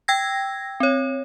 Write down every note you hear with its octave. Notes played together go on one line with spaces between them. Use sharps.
G5 E6 G#6 A#6
C4 C#5